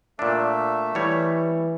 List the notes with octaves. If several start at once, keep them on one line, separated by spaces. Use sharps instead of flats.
A#2 A3 D4 E5
E3 G3 C#5